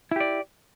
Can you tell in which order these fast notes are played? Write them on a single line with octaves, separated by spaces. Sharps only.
E4 G4 D5